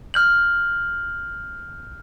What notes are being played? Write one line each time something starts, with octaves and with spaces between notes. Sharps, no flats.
F6 G6 F#7